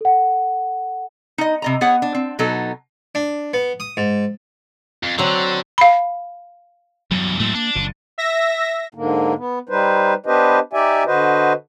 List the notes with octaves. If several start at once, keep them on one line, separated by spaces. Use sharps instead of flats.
A4 F#5
D#4 D#5
C3 D#5 A#5
B3 G#4 C#5 F#5
D4
C4
B2 F#3 B3 D#4 A4
D4
B3
D#6
G#2
F2
D3 F#3 C4
F5 B5
E2 G2 F#3
A2 F#3 G#3 A3 C4
A#3 D4
F#1 A#2
E5 A#6
G#2 D3 A#3
B3
G3 D#4 B4 C5
B3 D4 G4 B4 C5 D#5
D#4 G4 D5 E5 G#5
D3 F#4 B4 C5 D#5